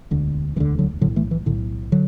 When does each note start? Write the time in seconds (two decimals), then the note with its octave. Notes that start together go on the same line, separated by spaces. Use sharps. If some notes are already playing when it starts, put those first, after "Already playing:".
0.11 E1 D2 D3
0.56 E1 D2 D3 E3
0.79 D3 F#3
1.01 A2 D3 F#3
1.05 B1
1.16 E3 A3
1.31 E3
1.46 B1 A2 D3
1.92 D3 F#3